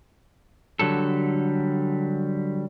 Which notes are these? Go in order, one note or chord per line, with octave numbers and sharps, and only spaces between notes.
D3 F#3 G3 A4